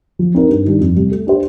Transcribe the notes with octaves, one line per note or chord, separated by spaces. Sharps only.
F3
C4 D#4 A#4
G2
D#3 G3 D4
F2
C3 G3
A3
D4 G4 C5